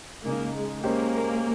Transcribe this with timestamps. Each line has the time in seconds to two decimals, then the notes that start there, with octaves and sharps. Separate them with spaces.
0.25 C#3 G#3 A#3 D#4
0.54 G#3
0.83 G#3 A#3 C#4 G4 C5